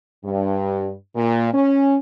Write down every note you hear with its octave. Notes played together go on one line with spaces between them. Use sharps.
G2
A#2
C#4